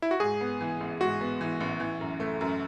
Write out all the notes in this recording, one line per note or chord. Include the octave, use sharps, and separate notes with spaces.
E4
F#4
G#2 G#4
B3
E3
A1
G#2 F#4
B3
E3
A1
E3
F#2
A3
F#2